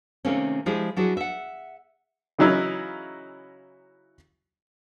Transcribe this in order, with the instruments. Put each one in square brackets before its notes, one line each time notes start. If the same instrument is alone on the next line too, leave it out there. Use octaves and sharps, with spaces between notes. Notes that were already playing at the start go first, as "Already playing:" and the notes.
[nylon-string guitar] C3 D#3 A3 A#3 C4 C#4
F3 G#3 E4 G4 G#4
F#3 D4 E4 F#4 G#4
E5 F#5
[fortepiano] C#3 E3 F#3 D#4 E4 A#4